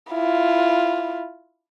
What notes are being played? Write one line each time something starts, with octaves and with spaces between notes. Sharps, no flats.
E4 F4